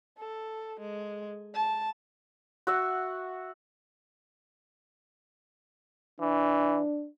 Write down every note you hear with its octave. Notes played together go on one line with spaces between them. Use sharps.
A4
G#3
A5
F#4 E5 F#5
E3 D4